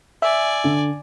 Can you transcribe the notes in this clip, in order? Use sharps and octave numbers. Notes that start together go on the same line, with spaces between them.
D5 E5 G#5
D3